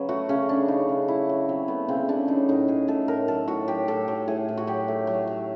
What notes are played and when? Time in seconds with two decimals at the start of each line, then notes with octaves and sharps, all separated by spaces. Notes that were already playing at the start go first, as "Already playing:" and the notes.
Already playing: C#3 F#3 B4
0.09 A3 F#4
0.29 C#3 C#4
0.49 C#3 D4
0.68 C#3 D#4
0.89 C#3
1.08 F#3 E4
1.29 F#3
1.49 F#3 C4
1.68 A3 B3
1.88 C#3 C4
2.08 C#3 D4
2.28 F#3 D#4
2.49 A2 D#4
2.68 F#3 G#4
2.88 A3 A4
3.08 A2 A#4
3.28 F#3 A4
3.48 A2 F#4
3.68 F#3 G4
3.88 A2 A4
4.08 F#3
4.28 A2 G#4
4.48 A2
4.57 F#4
4.67 F#3 G4
4.88 A3
5.07 F#3
5.27 F#3